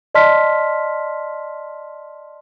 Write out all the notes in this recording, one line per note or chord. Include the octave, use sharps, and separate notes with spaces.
D5 D#5 A5 C6 F6 B6